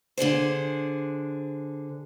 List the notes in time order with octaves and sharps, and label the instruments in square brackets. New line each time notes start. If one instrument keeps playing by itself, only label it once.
[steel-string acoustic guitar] D3 D4 G#4 C5